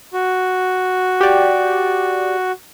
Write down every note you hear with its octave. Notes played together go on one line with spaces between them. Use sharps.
F#4
G4 D5